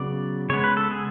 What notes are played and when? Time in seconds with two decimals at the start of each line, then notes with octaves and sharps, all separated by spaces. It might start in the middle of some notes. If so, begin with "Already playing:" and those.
Already playing: C#3 F#3 B3 D5
0.49 C#3 G#3 B3 C#5
0.64 B4
0.77 A4
0.91 G#4